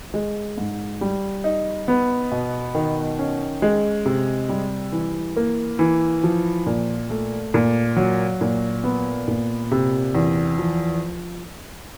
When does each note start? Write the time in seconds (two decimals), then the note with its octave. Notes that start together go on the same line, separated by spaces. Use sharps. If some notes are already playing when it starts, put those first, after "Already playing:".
0.14 G#3
0.58 G#2
1.01 G3
1.44 D#4
1.88 B3
2.32 B2
2.75 D#3
3.19 C#4
3.62 G#3
4.06 C3
4.49 G3
4.92 E3
5.37 A#3
5.79 E3
6.23 F3
6.66 A#2
7.10 A3
7.54 A#2
7.96 F#3
8.41 A#2
8.84 B3
9.28 A#2
9.71 C3
10.15 E2
10.58 F3